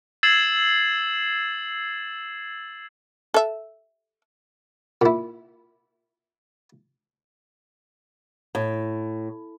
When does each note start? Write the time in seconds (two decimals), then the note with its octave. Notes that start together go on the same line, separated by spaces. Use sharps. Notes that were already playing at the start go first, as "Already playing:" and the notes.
0.23 E6 G#6 A6 C7 E7 F#7
3.34 A4 E5
5.01 A#2 E4
8.55 A2